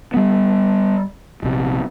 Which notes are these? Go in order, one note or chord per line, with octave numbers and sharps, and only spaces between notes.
G3 B3
A#1 C3